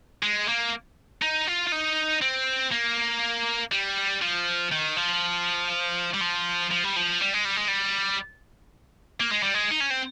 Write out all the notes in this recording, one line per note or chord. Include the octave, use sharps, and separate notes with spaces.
G#3
A#3
D#4
F4
F4
D#4
C4
A#3
G3
F3
D#3
F3
G3
F3
F3
G3
F3
G3
G#3
G3
G#3
G3
A#3
G#3
G3
G#3
D#4
C#4
C4